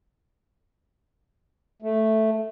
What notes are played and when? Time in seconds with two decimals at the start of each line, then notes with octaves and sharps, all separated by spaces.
1.82 A3